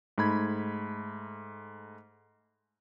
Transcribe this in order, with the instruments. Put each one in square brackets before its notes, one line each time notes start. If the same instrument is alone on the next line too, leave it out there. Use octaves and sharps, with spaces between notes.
[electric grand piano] G#2 A3 B5 G#6